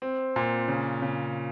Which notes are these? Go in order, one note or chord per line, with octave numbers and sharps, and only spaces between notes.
C4
A#2
C#3
C#3